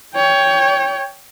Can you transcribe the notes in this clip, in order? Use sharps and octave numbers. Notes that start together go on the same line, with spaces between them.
C#5 G5